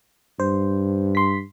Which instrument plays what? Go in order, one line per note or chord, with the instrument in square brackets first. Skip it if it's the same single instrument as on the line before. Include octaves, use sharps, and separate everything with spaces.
[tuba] G2 [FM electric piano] C5
[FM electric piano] C6 B6